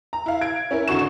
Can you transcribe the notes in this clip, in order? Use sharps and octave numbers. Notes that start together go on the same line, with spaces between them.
A#5
E4 F5
G#6 D7
C#4 E4 A#4
G#1 D3 F#4 C#6 E7